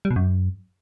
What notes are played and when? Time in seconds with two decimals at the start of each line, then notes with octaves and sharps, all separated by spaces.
0.05 G3
0.11 B2
0.16 F#2